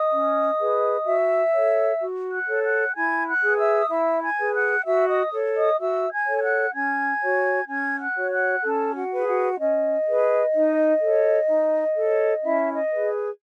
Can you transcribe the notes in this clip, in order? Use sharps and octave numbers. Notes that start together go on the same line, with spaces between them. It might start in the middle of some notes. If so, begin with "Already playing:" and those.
Already playing: D#5 D#6
C#4
G#4 B4
F#4 E5 E6
A4 C#5
F#4
F#5 F#6
A4 C#5
F#5 F#6
E4 G#5 G#6
F#5 F#6
G#4 B4
E5 E6
D#6
E4 E5 E6
G#5 G#6
G#4 B4
F#5 F#6
F#4 E5 E6
D#5 D#6
A4 C#5
D#5 D#6
F#4 E5 E6
G#5 G#6
A4 C#5
G#6
F#5 F#6
C#4 G#5 G#6
F#4 C#5
C#4 G#5 G#6
F#5 F#6
F#4 C#5
F#5 F#6
C#4 A4 A5
F#4 F#5
G#4 B4
F#4 F#5
C#4 D#5
G#4 B4
D#4
A4 C#5
D#4
A4 C#5
C#4 E4 E5
D#5
G#4 B4